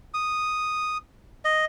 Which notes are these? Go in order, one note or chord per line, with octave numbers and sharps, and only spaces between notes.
D#6
D#5